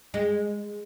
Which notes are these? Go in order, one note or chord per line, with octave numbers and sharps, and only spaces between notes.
G#3